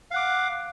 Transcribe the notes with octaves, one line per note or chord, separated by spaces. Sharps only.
F5 F#5 D6